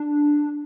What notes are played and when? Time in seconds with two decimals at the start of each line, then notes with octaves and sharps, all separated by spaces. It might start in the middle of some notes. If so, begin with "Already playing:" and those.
Already playing: D4